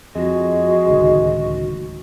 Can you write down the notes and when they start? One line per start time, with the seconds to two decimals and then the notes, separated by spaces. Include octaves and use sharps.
0.16 F2 G#3 F#4
0.88 D1 C#2 D#3